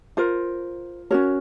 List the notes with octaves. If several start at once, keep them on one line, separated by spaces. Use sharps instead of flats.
F4 A#4 C5
C#4 F#4 A#4 C#5